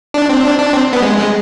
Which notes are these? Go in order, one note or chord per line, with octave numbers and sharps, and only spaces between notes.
D4
C4
D4
D4
C4
B3
G#3
G#3